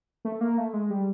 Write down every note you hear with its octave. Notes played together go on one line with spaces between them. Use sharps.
A3
A#3
A3
G#3
G3